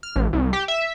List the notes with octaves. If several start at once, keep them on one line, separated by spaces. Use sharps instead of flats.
F6
A1
C2
G4
E5